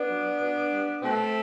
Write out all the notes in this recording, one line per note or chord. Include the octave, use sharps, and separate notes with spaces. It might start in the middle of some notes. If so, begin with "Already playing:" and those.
Already playing: B3 D4
F#3
B2
G3
B2 A3 C4